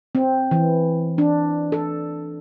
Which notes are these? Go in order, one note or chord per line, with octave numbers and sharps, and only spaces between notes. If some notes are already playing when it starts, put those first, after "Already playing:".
C4
E3
D4
A4